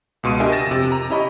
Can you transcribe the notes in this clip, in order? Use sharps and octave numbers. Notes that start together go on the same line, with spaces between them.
C#2 B2 C6 D#7
D4 G4 A#4 D#5 E5 G#5
A6 A#6 E7
F2 C3
A#5
C#4 E4 G4 D#5 B5 C#6